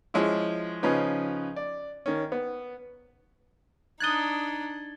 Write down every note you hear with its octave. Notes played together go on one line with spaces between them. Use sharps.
F3 G#3 C#4 E4
C#3 F3 C#4 D#4 B4
D5
D#3 C#4
B3
D4 D#4 D#6 F#6 G#6 A6 G7